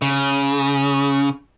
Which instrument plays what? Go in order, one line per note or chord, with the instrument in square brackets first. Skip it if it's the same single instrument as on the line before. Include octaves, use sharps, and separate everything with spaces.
[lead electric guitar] C#3